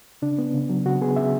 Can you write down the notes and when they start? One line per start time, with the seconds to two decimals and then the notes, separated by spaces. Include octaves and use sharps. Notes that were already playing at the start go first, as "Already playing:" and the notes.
0.22 C#3 D4
0.39 B3
0.54 C#3
0.70 F#3
0.86 C#3 F#4
1.01 B3 G#4
1.16 C#3 E5